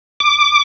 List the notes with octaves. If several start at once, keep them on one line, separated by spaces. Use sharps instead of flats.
D6